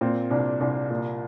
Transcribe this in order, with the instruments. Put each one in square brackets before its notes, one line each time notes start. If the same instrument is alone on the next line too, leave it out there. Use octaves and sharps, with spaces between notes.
[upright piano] A#2 C4
C2 D4
C2 D4
A#2